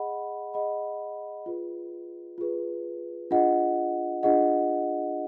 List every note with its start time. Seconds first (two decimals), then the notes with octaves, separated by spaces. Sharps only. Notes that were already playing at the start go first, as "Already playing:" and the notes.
Already playing: G#4 D#5 F#5 B5
0.54 G#4 D#5 F#5 B5
1.46 F4 G#4 B4
2.38 F4 G#4 B4
3.31 D4 F4 G#4 D#5 F#5
4.23 D4 F4 G#4 D#5 F#5